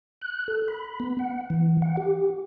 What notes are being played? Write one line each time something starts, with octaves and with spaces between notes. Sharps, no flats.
F#6
A4
B5
B3
F#5
E3
F#5
G4